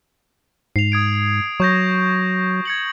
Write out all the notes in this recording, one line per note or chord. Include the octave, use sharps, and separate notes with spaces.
G#2 C7 F7
D#6 G#6 D7
F#3 C#6 G6 A#6
G#6 C#7 F#7